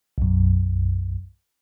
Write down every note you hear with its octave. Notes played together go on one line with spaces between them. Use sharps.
B1 F#2